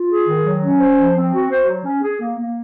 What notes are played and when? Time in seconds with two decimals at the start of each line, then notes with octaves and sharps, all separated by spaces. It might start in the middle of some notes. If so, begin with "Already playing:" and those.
Already playing: F4
0.09 G#4
0.27 D#3
0.44 F#3
0.62 C#4
0.80 C5
0.97 F3
1.14 C4
1.33 F#4
1.50 C5
1.67 F#3
1.85 C#4
2.02 G#4
2.20 A#3
2.38 A#3